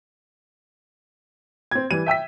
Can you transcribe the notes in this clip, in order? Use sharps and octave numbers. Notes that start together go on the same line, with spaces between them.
C4 G#6
E3 G3 B4 D#7
E5 G5 E6 B6